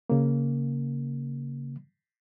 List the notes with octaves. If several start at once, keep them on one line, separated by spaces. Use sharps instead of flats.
C#3 A#3